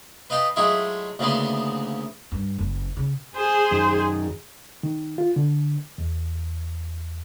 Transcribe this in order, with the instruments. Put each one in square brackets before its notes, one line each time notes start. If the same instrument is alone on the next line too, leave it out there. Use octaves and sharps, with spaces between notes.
[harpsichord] B4 D#5 F5 G5 A5
F#3 G#3 A3 E4 F4 G#4
D2 C#3 E3 A#3 B3 C6
[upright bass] G2
F#1
C#3
[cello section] G#4 [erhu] C5
[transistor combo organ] F#2 D#3
[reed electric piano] D#3
F4
D3
E2